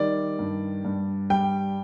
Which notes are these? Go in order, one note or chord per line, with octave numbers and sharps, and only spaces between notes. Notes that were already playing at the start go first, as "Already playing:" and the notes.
Already playing: D#3 G3 D5
G2
G2
G3 G5